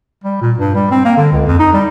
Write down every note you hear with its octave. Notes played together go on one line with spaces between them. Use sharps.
G3
A#2
G2
G3
C4
A#3
D3
C#2
F2
D#4
G3